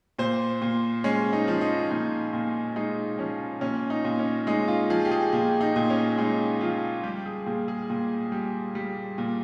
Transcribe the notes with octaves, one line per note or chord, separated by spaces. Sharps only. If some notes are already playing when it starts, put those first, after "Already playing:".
A#2 C5
A#2
G#3 C#4
D#4
F3
D#4
A#2 D#4
A#2
G#3 D#4
F3 C#4
A#2 C#4
D#4
A#2
C#4
G#3 D#4
F4
F3 G#4
G4
G#4
A#2 G4
D#4
A#2
C#4
G#3 D#4
F3 F4
G3 G4
G#4
A#2 G#4
G#4
A#2
G3
G3
A#2